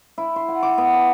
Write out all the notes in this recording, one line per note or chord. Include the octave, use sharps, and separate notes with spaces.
E4
C6
F#5
D6
B3
A5